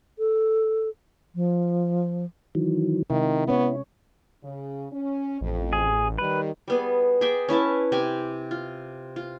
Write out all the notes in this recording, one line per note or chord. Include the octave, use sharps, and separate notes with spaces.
A4
F3
D#3 E3 F#3
C3 D#3 G#3 E4
B3 C#4 C#5
C#3
C#4
A1 F2
G#4
D#3 G3 B4
G3 B3 G#4
G#4 D5 E5 G5
C#4 E4 B4 A5
C3 C4 G4 G#5
F4
F4